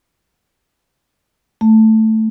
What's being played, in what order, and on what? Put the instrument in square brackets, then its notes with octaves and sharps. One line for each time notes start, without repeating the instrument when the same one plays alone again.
[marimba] A3